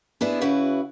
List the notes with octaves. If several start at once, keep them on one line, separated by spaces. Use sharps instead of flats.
B3 D4 E4 G#4
C#3 E4 F#4 B4